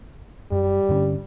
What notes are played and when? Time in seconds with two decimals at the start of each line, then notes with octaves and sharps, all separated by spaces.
0.52 F#2 G3
0.89 G2 D3 C#4